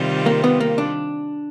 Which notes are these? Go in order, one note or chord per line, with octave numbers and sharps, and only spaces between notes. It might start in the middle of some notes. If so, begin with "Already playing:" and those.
Already playing: C3 D#3 G3 C4 F4
A#3
B3
A#3
D4